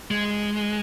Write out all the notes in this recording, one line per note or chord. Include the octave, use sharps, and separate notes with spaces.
G#3